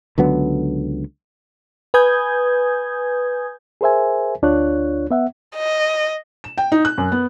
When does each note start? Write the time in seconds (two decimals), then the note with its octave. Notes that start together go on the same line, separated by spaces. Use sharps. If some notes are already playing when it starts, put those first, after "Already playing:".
0.18 C#2 D3 F#3 B3
1.94 B4 G#5 D#6 G6 G#6
3.81 G#4 A#4 C5 E5 G#5
4.42 D2 D4 F4 C#5 F#6
5.11 B3 E5 F#5
5.56 D#5
6.44 E7
6.58 G5
6.72 D#4
6.85 F#6
6.98 F#2
7.12 B3